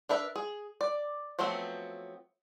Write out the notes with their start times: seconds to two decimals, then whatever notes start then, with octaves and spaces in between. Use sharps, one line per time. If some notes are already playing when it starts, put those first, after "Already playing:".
0.09 D4 A#4 B4 E5
0.36 G#4
0.81 D5
1.39 F3 F#3 A3 B3 C4